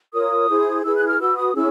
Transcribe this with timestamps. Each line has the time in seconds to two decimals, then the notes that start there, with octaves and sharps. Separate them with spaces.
0.13 F4 A#4 C#5 D#6
0.49 E4 G#4 C5
0.84 E4 G#4 B4 E6
0.96 F#6
1.08 F6
1.20 F#4 B4 E6
1.37 D#6
1.55 C#4 E4 G#4 E6